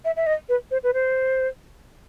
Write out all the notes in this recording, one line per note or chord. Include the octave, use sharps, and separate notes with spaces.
E5
E5
D#5
B4
C5
B4
C5